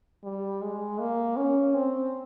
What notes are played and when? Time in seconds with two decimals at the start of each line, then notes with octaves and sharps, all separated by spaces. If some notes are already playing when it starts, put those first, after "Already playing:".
0.24 G3
0.62 G#3
0.99 A#3
1.37 C#4
1.74 C4